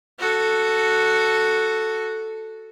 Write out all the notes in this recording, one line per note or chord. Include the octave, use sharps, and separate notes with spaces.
F#4 A4